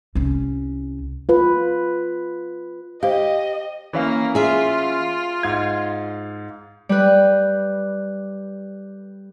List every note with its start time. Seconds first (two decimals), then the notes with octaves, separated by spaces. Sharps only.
0.15 C2 C#4
1.29 F4 B4
3.03 G4 C5 D#5 F5
3.93 E3 A#3 C#4 F5
4.35 F4 G#4 E5
5.43 G#2 F5 G#6
6.89 G3 B4